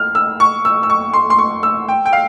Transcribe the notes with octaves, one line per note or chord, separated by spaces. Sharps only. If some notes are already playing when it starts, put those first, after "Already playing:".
Already playing: F6
E6
C#6
E6
E6
C#6
C6
C6
C#6
E6
G5
G5
F5